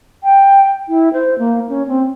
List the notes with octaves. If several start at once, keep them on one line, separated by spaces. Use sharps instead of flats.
G5
E4
C5
A#3
C#4
C4